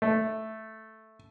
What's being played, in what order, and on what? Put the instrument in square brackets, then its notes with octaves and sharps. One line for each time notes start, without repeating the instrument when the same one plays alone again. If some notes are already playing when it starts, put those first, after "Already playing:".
[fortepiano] A3